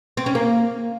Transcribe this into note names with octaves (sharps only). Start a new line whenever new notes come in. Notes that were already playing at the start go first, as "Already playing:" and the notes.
C4
C#4
A#3